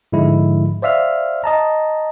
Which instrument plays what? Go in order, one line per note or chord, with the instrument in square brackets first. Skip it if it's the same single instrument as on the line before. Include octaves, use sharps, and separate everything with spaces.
[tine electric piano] G#2 D3 F3 G#3 E4
C5 D5 E5 F5 F6
D#5 A5 A#5